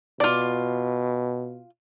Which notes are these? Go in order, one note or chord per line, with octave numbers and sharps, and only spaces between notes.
B2 F4 D5